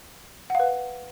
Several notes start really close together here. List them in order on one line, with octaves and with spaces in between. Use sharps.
F#5 F5 B4